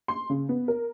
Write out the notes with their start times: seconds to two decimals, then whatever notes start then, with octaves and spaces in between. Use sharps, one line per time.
0.08 C6
0.30 C#3
0.49 B3
0.68 A#4